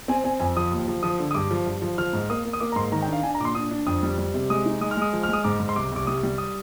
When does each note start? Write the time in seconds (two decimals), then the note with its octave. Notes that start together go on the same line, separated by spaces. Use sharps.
0.08 C4 G#5
0.24 C4 G#5
0.40 F2 G#5
0.57 F3 D#6
0.72 D#2
0.88 F3
1.03 F3 D#6
1.19 D3
1.31 D#6
1.35 G2 D6
1.51 F3
1.66 G2
1.82 F3
1.98 F3 F6
2.13 G#2
2.30 A#3 D#6
2.45 A#3
2.53 D#6
2.60 A#3 D6
2.72 A#5
2.76 G#2 C6
2.92 D#3 A#5
3.02 G5
3.08 D4 F5
3.23 D4 G#5
3.34 A#5
3.40 A#2 D6
3.45 C6
3.55 D4 D#6
3.71 D4
3.87 F2 D#6
4.03 G3
4.18 G3
4.34 C3
4.50 G#3 D#6
4.65 D#4
4.81 G#3 D#6
4.91 F6
4.97 G#3 D#6
5.13 F3
5.23 F6
5.29 G#3 D#6
5.44 G#2 D6
5.60 G#2
5.69 C6
5.76 C2 D6
5.92 C2 D6
6.07 G3 D#6
6.23 G3
6.38 D#6